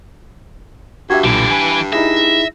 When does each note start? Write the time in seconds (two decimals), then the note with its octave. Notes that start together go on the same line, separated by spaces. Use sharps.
1.10 G2 F#4 G4 E5 G#6
1.24 B1 A#2 D3 E3 D7
1.51 E3 B4 G#5
1.93 D#4 E4 G#4 E5 A#6